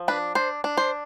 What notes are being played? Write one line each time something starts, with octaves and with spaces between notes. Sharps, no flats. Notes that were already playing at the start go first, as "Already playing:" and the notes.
Already playing: F3
D4 B4
D4 C5
D4
C5